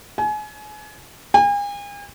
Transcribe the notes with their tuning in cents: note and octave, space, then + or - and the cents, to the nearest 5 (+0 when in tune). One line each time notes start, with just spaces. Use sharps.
G#5 +30
G#5 -40